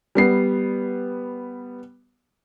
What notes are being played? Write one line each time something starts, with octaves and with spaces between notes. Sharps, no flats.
G3 B3 C7